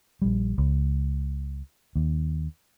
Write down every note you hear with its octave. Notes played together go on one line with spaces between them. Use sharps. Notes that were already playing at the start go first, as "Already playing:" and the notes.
A#1 G3
C#2
D#2